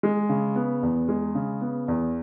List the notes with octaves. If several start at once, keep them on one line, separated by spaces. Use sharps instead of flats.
G#3
C#3
B3
E2
G#3
C#3
B3
E2